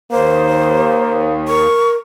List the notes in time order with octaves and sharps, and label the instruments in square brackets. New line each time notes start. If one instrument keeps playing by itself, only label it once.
[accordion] D#2 [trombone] A#3 [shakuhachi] C5
[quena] A#4 [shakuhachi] C#6